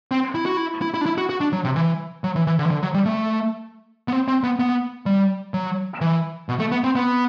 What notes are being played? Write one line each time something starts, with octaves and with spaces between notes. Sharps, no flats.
C4
E4
F#4
E4
E4
E4
D4
E4
F#4
F#4
D4
F#3
C3
E3
F#3
E3
E3
D3
E3
D3
F#3
G3
A3
B3
C4
C4
B3
B3
G3
F#3
E3
B2
A3
B3
C4
B3